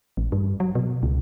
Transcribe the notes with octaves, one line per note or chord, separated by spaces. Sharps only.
A1
G2
F#3
B2
C#2